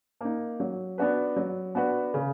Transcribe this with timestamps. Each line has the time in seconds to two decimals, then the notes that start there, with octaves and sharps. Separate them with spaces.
0.21 A#3 D#4
0.60 F#3
0.98 B3 D4 F#4 B4
1.36 F#3
1.75 B3 D4 F#4 B4
2.14 C#3